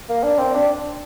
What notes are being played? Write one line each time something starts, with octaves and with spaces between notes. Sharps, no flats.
A#3
D4
C4
D4